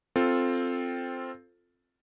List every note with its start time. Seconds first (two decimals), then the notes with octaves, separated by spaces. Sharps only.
0.16 C4 F4 A4